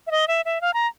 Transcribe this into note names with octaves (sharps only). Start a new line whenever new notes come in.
E5
D#5
E5
E5
F5
A#5